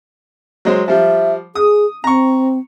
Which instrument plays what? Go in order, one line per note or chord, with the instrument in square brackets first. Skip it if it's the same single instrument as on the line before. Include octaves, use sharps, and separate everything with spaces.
[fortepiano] F#3 G#3 C5
[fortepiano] F3 G3 [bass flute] E5
[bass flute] G#4 [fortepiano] D#6
[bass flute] C4 [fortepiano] A#5 C#6